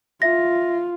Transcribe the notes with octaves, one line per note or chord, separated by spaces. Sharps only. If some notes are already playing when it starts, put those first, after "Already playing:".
F4 E5 A#6